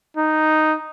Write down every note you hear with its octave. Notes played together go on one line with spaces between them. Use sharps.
D#4